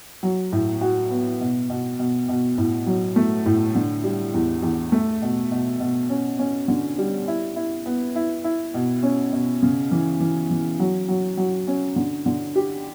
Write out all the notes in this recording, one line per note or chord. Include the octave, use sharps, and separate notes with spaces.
F#3
A2
F#4
B3
B2
B2
B2
B2
A2
F#3
A3
A2
D3
G3
E2
E2
A3
B2
B2
B2
C#4
C#4
D3
G3
E4
E4
B3
E4
E4
B2
C#4
B2
C#3
E3
E3
E3
F#3
F#3
F#3
C#4
D3
D3
G4